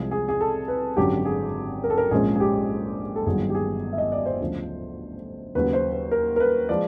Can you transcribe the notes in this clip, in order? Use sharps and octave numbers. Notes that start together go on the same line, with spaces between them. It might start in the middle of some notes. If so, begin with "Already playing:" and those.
Already playing: C2 C3 F3 G#3 G#4
G#4
G#4
A4
B4
G#1 F#2 D3 F#3 G4
G#4
A#4
A4
A#4
A#1 G#2 F3 G#3 C#4 G#4
G#4
G4
A4
G1 G2 D#3 F#3 G#4
G4
G#4
E5
D#5
D5
C5
D2 C#3 F3
D#2 C#3 F#3 B4
C5
B4
A#4
A#4
B4
F3 G#3 D5